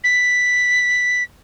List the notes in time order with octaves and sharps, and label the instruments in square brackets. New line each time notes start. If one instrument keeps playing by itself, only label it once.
[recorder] B6